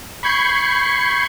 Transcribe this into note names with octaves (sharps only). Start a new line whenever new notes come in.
B5 C#6 G6 G#6 C7 C#7